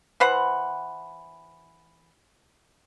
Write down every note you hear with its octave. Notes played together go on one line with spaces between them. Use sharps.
E3 B4 C5 F#5